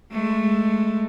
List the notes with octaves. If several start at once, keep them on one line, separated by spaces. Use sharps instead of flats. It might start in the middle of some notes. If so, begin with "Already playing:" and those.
G#3 A3